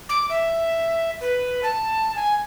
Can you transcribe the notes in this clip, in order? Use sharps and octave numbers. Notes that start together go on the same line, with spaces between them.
D6
E5
B4
A5
G#5